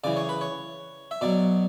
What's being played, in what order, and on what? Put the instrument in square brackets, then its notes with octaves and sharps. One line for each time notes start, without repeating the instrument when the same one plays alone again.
[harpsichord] C#3 E3 D5
C#5
B4
C#5
E5
B2 F#3 D5